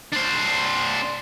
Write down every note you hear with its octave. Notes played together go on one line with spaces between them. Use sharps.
D4 C5